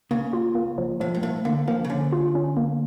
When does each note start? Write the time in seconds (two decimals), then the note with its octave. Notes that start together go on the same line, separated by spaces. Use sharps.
0.11 C#3 A#3
0.33 F4
0.55 A#3
0.78 F3
1.00 A2 F3
1.15 G2
1.23 A2 A#3
1.45 D3 A#3
1.68 F3 A#3
1.85 C#3
1.90 D3 C#4
2.13 F4
2.35 C#4
2.57 A#3